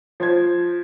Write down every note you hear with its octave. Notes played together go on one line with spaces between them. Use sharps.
F3 C5 G#6